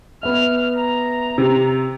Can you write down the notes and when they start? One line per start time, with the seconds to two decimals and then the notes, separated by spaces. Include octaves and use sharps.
0.23 B3 E5 F6
0.76 A#5
1.38 C3